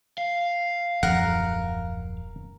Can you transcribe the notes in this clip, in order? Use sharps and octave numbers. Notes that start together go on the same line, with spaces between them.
F5
D#1 F#2 F3 A#4 F#5